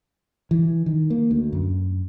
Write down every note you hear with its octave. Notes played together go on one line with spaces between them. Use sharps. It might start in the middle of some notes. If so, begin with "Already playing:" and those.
E3
D#3
A#3
D2
F#2